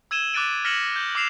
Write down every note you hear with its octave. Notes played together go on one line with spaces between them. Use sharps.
E6 G#6 D#7 E7 G7
D6 F#6 A6 D7 D#7
F6 A#6 B6 C#7 E7 F#7
G6
D6 E6 C7 E7 F7